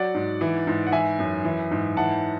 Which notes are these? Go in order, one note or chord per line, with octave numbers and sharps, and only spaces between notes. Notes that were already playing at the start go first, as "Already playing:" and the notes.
Already playing: F#3 D5 F#5
G#2
E3
G#2
F#5
E3 E5 G#5
F#2
E3
G#2
E3 F#5 A5